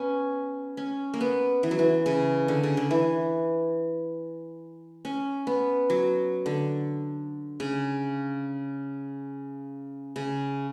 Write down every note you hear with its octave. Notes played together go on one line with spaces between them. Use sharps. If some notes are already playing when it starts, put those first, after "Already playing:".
Already playing: B3 C#4
C#4
A#3
B3
E3
F#3
E3
C#3
D3
C#3
D3
E3
C#4
B3
F#3
D3
C#3
C#3